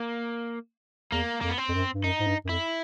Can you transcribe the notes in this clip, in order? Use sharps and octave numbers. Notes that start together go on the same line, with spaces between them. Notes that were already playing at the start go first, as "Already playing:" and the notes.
Already playing: A#3
E2 A#3
F2 A#3
B3
C4
F2
F#2
G2
F#2 D#4
G#2
G2
F#2
F2 E4